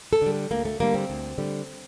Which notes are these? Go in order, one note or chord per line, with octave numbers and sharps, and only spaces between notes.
A4
D3 G3
D2 A#3
A3
D3 G3 A#3
C4
D2
D3 G3